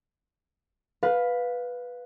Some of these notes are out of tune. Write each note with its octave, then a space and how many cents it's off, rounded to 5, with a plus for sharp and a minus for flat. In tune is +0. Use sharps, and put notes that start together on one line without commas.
B4 +0 F5 +15